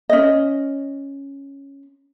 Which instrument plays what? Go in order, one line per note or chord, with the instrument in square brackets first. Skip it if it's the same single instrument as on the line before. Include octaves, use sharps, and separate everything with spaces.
[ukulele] C#4 D#5